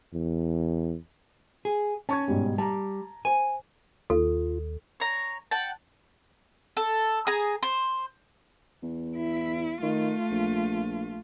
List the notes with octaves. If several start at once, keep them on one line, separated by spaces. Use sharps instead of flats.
E2
G#4
C#4 A5 C#6 G#6
G#2 B2 G3
G3 A5 A#5
C5 G#5
D#2 F4 A4
C#5 A#5
F#5 G5 A5
A4
G#4 A#5
C5
E2
E4
D#3 A3 F4
A#1